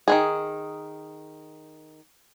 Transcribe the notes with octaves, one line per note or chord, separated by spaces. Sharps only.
D#3 G#3 G#4